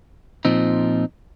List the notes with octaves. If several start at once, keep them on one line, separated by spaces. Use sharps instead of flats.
A#2 F3 C4 D#4